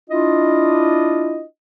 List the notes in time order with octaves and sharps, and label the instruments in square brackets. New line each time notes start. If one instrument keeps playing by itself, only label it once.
[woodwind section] D4 E4 F4 D#5